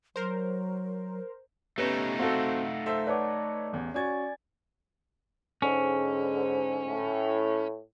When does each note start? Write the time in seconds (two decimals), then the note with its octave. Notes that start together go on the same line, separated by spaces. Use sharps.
0.16 F#3 A#4 C5
1.78 A3 B3 C#4 D#4 G4 B4 E7
2.19 C4 F#4 A4 F5 F#5
2.86 A4 C5 E5
3.07 B4 C#5 D5 F#5 A5 D6
3.73 A1 E2
3.94 C#4 F#4 D5 G#5 G#6 A6
5.62 G#2 D3 C#4
6.86 A2